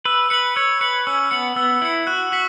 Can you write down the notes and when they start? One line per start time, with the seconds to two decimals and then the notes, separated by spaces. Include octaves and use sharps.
0.05 B4 E6
0.30 B4 C#7 F#7
0.56 C#5 E6
0.81 B4 C#7 F#7
1.07 C#4 E6
1.31 B3 C#7 F#7
1.56 B3 E6
1.82 E4 C#7 F#7
2.07 F#4 F#6
2.32 F#4 B6 F#7